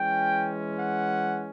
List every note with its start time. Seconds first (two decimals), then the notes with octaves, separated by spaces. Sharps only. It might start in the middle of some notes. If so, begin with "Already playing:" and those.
Already playing: E3 G#3 C#4 G5
0.78 F#5